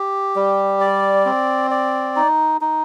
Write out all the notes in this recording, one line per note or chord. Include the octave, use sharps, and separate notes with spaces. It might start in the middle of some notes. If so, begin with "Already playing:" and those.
Already playing: G4
G3
D5
C4
D5
D#4
D#4